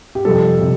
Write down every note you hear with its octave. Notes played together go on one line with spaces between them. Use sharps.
G4
F2 C3 G3 A4
C3 G3